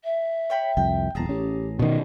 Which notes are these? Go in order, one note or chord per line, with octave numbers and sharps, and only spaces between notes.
E5
C#5 G5 B5
C2 F2 G5
D#1 E2 G#4 A5 A#5
A1 C#4 G4
B2 D#3 D#5